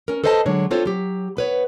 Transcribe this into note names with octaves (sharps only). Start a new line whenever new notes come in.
C#4 A#4
A4 B4 C5 D#5 F5 A5
D3 F#3 G#3 D4 C#5
C4 D4 F4 A4 C5 C#5
F#3 G4
B3 B4 C#5